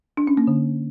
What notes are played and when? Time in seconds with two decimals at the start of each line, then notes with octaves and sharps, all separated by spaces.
0.17 D4
0.27 C#4
0.37 A#3
0.47 D3